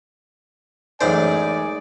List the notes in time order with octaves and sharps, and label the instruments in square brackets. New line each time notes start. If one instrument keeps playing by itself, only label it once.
[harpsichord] A1 F#2 C5 [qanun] G#3 D#4 [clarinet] D5 [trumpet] G#5